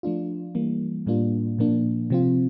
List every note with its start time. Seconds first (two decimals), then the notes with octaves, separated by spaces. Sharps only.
0.03 F3 A3 D4 F4
0.55 E3 G3 A#3
1.06 A2 G3 A#3 D4 F4
1.59 A#2 F3 A#3 D4
2.10 C3 F3 C4 F4